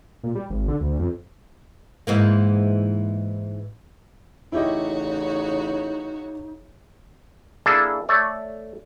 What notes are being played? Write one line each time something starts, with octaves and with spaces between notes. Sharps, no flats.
A#2
G3
G#1
D3
D2
F2
G#2 E3 A#3
A1 C#3 D#4 E4 F#4 G4 C#5 D#5
A#3 D4 E4 G#4 A4
A3 A4 C#5 D5